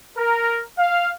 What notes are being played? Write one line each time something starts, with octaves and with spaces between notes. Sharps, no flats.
A#4
F5